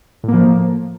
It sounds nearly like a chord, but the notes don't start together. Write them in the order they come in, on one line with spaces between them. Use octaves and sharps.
A2 A#3 F3